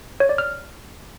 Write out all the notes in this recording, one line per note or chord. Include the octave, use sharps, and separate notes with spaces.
C#5
D5
F6